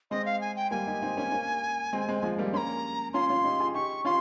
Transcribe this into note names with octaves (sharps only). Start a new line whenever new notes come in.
G#3 C4 D#5
F5
G#5
G5
G3 A#3 G#5
D#4 G4
C4 D#4
A#3 C#4
A#3 C#4
G#3 C4
G#3 C4
F3 G#3
G3 A#3
A#3 C#4 A#5 C6
C#4 F4 C6
C#4 F4
D#4 G4
F4 G#4
D#4 G4 C#6
C#4 F4 C6